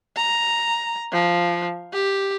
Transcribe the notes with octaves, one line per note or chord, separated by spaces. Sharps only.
A#5
F3
G4